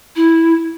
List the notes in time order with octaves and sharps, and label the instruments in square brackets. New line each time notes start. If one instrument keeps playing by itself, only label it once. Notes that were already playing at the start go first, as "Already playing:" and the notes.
[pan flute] E4